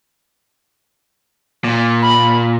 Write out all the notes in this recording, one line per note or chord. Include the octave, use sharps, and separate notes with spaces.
A#2
B5